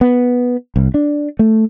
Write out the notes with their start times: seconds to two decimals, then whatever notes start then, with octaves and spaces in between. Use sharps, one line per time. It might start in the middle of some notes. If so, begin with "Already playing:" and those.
0.01 B3
0.76 C2
0.94 D4
1.39 A3